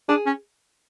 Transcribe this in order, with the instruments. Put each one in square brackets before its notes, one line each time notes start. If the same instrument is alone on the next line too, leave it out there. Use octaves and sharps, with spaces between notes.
[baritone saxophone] D4 [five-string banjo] G#4
[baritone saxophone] C#4